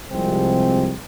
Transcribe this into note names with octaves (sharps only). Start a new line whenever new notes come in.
C2 C3 F3 G#3 C4